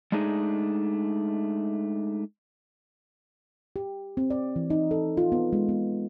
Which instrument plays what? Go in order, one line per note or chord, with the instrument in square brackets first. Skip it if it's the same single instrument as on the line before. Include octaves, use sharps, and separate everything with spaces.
[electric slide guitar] G#3 A3 D4 D#4 G#4
[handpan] G4
C4
D5
E3
D#4
A4
F4
B3
G#3
B3